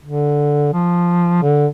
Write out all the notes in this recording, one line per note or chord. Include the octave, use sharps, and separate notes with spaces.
D3
F3
D3